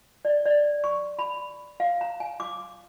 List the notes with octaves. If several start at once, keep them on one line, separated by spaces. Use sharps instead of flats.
D5
D5
C#6
B5
F5
A#5
G#5
D6